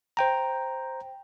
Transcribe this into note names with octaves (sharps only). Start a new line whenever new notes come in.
C5 G5 A#5